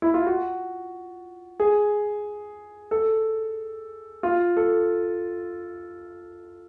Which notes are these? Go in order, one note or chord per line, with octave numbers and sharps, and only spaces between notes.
E4
F4
F#4
G#4
A4
F4
A4